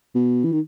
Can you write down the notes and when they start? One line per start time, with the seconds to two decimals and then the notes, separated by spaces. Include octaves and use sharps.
0.15 B2
0.44 E3
0.52 D#3